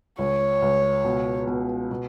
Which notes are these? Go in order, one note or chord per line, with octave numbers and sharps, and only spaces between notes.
C#2 C#5
C#2
B2
B2
B2